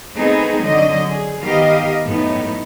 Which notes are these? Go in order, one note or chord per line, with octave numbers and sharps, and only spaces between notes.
A3 B3 C4 D#4 G#4
D3 F#3 D#5
G#4
D#3 B3 G4 A#4 D#5 F5
F#2 A2 A3 B3 D#4